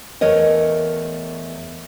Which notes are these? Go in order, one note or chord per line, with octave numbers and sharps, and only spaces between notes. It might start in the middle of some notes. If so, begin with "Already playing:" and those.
E2 A3 A#4 C#5 D#5